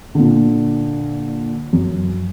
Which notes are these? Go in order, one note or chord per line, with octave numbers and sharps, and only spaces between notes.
A#2 D3
F#2